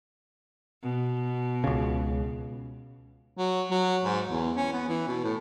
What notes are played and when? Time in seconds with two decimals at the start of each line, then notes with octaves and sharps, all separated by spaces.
0.83 B2
1.64 C#2 C#3
3.37 F#3
3.71 F#3
4.05 G#2
4.29 E2
4.56 C#4
4.73 B3
4.89 E3
5.08 B2
5.24 A2